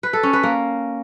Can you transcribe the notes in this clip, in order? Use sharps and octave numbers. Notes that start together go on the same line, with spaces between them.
B4
A4
C#4
B4
A#3